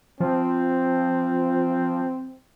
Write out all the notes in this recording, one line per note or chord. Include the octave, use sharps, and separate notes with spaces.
F3 C4